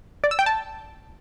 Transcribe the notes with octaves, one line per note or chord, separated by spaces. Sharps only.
D5
E6
G5
A5